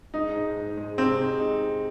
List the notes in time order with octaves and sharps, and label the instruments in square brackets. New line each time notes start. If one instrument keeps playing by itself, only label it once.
[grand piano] G#3 [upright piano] D#4
[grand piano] G#2
G#2
G#3
[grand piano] C3 [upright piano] C4
[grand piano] G#3
D#4